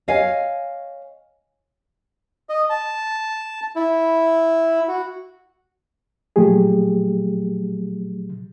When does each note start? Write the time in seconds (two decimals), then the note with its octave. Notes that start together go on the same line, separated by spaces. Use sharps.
0.08 C#5 D#5 F5 G#5
2.49 D#5
2.70 A5
3.76 E4
4.88 F#4
6.36 A#2 F3 F#3 A3 G4 G#4